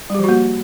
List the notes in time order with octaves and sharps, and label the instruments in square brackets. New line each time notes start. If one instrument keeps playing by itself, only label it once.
[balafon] G3
G4
F3
F#4
A#3